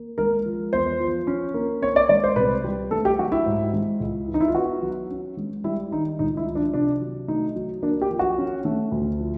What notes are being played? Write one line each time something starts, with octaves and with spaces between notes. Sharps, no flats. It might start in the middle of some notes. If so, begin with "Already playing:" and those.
Already playing: A#3
G#3 A#4
F3
E2 C5
F3
C#4
A#3
C4 C#5
D5
G#3 D5
C5
C2 B4
G3
A3 A4
G4
F#3 F#4
E4
G#2
G#3
C#2
E3
D#4
E4
F4
B3 F#4
F#3
C#4
G#3
G3 E4
D#3 D#4
C#2 D#4
E4
F3
D4
C3 D4
F#3
A3 D#4
F#3
A#3 D4
G4
F3
F#4
C#4
A3
D2
F3